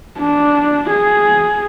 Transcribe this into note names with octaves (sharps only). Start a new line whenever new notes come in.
D4
G#4